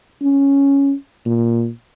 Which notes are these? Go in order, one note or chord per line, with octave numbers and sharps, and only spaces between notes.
C#4
A#2